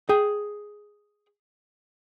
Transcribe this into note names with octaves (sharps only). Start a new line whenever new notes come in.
G#4 G5